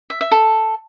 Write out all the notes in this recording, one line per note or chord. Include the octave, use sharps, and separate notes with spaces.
E5
E5
A4